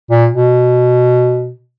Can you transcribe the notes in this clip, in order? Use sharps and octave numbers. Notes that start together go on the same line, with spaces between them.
A#2
B2